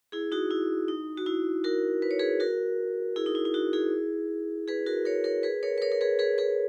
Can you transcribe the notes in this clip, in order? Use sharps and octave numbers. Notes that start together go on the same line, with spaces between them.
E4 G#4
D#4 F#4
E4
D#4
F#4
E4
F#4 A#4
B4
C#5
G#4 B4
F#4 A#4
E4 G#4
D#4
E4
E4
D#4 F#4
E4 G#4
G#4 B4
F#4 A#4
A#4 C#5
A#4 C#5
G#4 B4
A#4 C#5
B4
A#4 C#5
A#4
G#4 B4
G#4 B4
G#4 B4